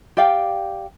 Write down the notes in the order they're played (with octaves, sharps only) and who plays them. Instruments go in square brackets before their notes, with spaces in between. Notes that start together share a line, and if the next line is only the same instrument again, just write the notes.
[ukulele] G4 D5 F5 G5